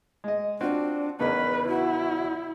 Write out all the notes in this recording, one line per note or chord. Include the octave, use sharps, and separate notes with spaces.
G#3 D#5
C4 D4 F4 F#4
E2 C#3 D#4 A#4 B4
E4 F#4